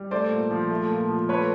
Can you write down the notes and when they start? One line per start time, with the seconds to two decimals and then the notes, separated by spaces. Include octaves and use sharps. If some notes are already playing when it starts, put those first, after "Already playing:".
Already playing: G3
0.11 A3 C5 D5
0.31 A#2
0.51 F3
0.71 A3
0.90 A#2
1.09 F3
1.29 A3 B4 C#5